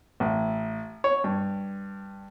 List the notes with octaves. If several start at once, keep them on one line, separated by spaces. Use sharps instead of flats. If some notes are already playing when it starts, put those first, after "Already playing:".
A1
C#5
G2